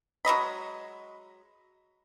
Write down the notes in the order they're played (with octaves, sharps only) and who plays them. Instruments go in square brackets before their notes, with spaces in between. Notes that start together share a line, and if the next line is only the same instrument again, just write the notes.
[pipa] F#3 G#3 D#5 B5